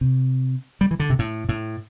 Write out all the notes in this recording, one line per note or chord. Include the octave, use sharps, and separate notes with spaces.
C3
G3
E3
D3
C3
A2
A2